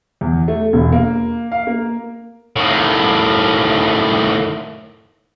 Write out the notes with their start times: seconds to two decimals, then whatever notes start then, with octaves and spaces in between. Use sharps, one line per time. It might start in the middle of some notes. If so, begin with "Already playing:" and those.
0.21 E2
0.48 A3
0.73 E1
0.92 A#3
1.52 F5
1.67 A#3
2.56 A2 D#3